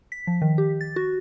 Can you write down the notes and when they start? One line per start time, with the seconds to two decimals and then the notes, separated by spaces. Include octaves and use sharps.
0.12 B6
0.27 F3
0.42 D#3
0.58 G4
0.81 A6
0.96 F#4